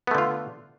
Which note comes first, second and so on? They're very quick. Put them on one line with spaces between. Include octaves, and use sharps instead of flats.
B3 A3 D3 F4